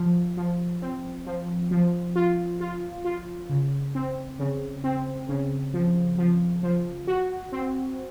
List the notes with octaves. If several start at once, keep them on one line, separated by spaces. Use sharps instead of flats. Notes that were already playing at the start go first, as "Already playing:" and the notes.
Already playing: F3
F3
C4
F3
F3
F4
F4
F4
C#3
C4
C#3
C4
C#3
F3
F3
F3
F#4
C4